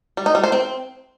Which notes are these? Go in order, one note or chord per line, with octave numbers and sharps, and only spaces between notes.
G3
D#4
G3
C5
C4